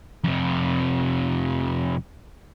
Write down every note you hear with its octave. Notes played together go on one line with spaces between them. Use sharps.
F2 C3